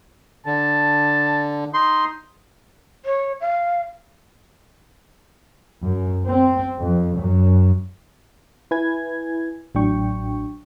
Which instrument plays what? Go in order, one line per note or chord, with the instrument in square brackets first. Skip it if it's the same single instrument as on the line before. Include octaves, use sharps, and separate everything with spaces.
[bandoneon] D3 [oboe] A5
[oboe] D#4 [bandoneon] C6
[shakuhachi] C#5
F5
[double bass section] F#2
C4
F2
F#2
[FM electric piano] E4 B4 G#5 G#6
A1 A2 F#3 D4 G5 C#6